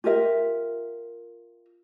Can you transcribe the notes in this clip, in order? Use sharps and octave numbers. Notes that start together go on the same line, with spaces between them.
F4 G4 A#4 E5